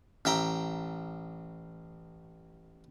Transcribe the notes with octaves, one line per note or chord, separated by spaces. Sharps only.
A1 E5 G5 A#5